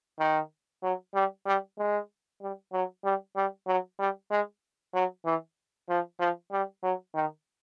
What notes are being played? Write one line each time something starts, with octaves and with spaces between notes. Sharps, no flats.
D#3
F#3
G3
G3
G#3
G3
F#3
G3
G3
F#3
G3
G#3
F#3
E3
F3
F3
G3
F#3
D#3